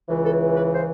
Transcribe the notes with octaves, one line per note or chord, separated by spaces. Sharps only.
C#2 C#3 E3
A4
B4
C5